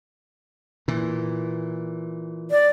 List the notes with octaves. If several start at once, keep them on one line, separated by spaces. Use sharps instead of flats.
A#2 E3
D5